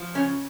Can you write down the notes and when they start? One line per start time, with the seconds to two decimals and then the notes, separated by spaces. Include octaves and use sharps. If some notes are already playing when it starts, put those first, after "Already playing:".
Already playing: F3
0.15 C#3 C#4